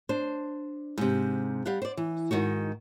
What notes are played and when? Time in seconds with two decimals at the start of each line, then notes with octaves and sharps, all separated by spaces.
0.09 D4 C5
0.98 G#2 C3
1.66 G3 F5 F#5
1.82 C5 D5
1.97 E3
2.31 G#2 D#3 D#4 F#4